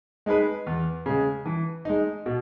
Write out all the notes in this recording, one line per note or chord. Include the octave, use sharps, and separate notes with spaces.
G#3 D#4 G#4 B4
E2
C#3 G#3
E3
G#3 D#4
B2